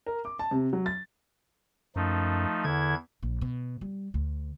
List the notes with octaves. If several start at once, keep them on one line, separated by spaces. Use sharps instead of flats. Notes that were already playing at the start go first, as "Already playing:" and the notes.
A#4
D6
A5
C3
F#3
A6
F#2 F3 A3 D#4
E2 D3 E4 G#6
A#1
B2
G3
D2